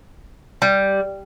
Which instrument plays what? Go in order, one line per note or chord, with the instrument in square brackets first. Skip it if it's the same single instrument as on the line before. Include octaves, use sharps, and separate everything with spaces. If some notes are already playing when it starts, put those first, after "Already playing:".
[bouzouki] G3